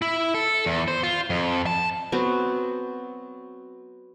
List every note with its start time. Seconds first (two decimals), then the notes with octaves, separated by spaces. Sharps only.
0.02 E4
0.35 A4
0.66 E2
0.88 C5
1.03 F4
1.30 F2
1.66 A5
2.12 F#3 B3 C4